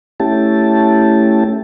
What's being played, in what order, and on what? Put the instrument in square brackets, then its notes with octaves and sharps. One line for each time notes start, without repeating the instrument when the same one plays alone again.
[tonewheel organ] A3 C#4 E4 G4 A5